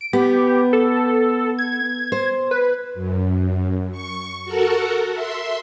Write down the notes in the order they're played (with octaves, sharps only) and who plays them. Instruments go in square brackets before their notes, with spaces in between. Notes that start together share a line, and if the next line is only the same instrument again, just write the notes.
[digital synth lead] D7
[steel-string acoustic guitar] B3 [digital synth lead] G4
[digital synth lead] A4
G#6
[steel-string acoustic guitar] C5
[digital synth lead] B4
[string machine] F#2
C#6
F#4 A4 A#4 F#5
E5 C6